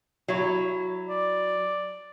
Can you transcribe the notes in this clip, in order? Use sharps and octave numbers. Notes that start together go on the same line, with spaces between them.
F#3 E4
D5